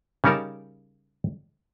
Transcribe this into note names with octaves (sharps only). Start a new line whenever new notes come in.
C#3 G3 C#4 D#4 A#4 A5